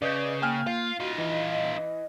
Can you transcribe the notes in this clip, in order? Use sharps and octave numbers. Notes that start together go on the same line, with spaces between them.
C#3 B4 D5 D#5 G6
A#3 G5 G#5 F6
F4 F5
D#4 F4 F#4
E3 D#5